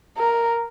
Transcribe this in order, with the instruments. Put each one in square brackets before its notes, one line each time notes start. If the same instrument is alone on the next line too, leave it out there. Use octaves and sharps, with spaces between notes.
[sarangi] A#4